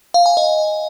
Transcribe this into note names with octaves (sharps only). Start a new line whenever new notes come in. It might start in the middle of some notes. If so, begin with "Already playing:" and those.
F5
G#5
D#5